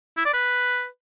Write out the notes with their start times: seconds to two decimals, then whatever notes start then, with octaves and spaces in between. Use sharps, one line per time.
0.17 E4
0.25 D5
0.34 B4